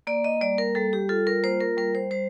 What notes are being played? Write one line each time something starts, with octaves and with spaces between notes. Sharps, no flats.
A#3 D5
D#5
G3 D5
A#4
G3 A4
G4
F4 A4
A#4
A#3 C5
A#4
G3 A#4
C5
G3 C5